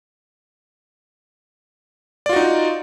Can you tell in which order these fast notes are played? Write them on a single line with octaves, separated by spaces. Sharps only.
D5 F4 F#4 D#4